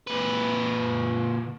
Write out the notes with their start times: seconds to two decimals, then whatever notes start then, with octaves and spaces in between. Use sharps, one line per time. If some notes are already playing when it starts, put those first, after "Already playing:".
0.07 A#2 B4